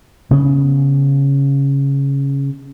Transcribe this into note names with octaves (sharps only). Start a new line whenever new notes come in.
C#3 B3 C#4